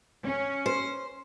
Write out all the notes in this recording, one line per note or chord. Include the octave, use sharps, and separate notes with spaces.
C#4
C5